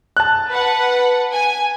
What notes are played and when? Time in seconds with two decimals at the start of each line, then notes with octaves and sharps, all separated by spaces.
0.17 A5 F#6
0.50 B4 F#5
1.33 G#5